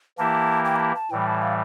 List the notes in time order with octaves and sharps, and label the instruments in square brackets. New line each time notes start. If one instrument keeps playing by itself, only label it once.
[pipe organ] E3 A#3 E4 G4 [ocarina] A5
[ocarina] G5
A#5
A5
A5
[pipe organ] A2 E3 G3 [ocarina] G5
[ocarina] A5
F5